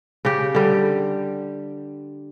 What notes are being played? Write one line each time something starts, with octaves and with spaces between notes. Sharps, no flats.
C#3 G4
D3 G3